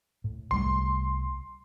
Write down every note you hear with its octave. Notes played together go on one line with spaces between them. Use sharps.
A2
C2 G3 A3 C6